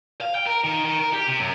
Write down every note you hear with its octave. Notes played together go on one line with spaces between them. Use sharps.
F5
G5
A#4
D#3
D#3
A#4
G4
C3
F#2